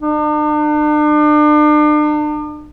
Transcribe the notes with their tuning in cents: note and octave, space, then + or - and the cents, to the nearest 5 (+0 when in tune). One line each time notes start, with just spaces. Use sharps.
D4 +40